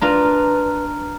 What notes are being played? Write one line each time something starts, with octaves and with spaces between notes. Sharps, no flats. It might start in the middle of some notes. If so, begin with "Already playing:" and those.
D4 F4 A#4 B4 A#5 F6 A6